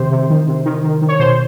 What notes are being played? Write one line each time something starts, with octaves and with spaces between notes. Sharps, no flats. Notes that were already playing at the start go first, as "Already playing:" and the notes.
Already playing: C3 D#3 C5
C3
D#3
C3
D#3
D#3
D#3
C#5
B2 C5